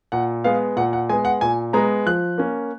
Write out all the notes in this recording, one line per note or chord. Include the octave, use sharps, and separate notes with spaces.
A#2 F#5
G#3 B3 F5
A#2 F#5
F#5
G#3 B3 G#5
F#5
A#2 G#5
G#3 B3 A#5
F3 F#6
A#3 C#4